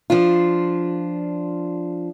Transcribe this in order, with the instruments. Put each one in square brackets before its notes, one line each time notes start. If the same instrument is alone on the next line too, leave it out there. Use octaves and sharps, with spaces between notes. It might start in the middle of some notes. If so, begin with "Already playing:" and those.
[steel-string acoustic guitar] F3 D4 F4